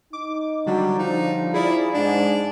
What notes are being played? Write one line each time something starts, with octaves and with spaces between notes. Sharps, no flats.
D#4 D6
D3 F#3 G3 D4
F3 D#4
E4 G#4 D5 F5
G#2 D4